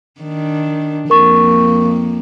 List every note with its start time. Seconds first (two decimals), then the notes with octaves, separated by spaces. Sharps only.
0.21 D#3 D4
1.10 F2 A#3 A#4 C#6